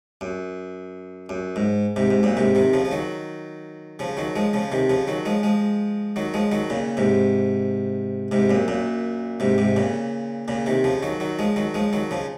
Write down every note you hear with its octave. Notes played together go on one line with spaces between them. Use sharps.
F#2
F#2
G#2
G#2 C3
G#2
F#2 A#2
G#2 C3
C3 D#3
C#3 F3
F3
D#3 F#3
C#3 F3
D#3 F#3
F3 G#3
C#3 F3
C3 D#3
C#3 F3
D#3 F#3
F3 G#3
F3 G#3
D#3 F#3
F3 G#3
D#3 F#3
A#2 C#3
G#2 C3
G#2 C3
F#2 A#2
F#2 A#2
G#2 C3
G#2 C3
A#2 C#3
A#2 C#3
C3 D#3
C#3 F3
D#3 F#3
D#3 F#3
F3 G#3
D#3 F#3
F3 G#3
D#3 F#3
C#3 F3